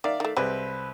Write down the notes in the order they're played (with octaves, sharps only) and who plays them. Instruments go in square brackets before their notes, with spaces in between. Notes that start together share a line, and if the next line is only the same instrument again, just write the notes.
[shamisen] D#3 [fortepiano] D5 E5 F5
[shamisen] D#3 A3
[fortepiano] C2 C4 B4 [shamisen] G3 G#3